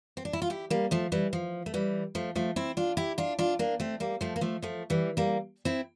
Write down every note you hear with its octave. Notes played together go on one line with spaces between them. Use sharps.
C4
D4
E4
F4
E4 G4
G3 A#3
F3 A3
E3 G3
F3
A3
E3 G3
F3 A3
F3 A3
C4 E4
D4 F4
E4 G4
D4 F4
D4 F4
A#3 D4
A3 C4
G3 A#3
F3 A3
A#3
F3 A3
F3 A3
E3 G3
G3 A#3
C4 E4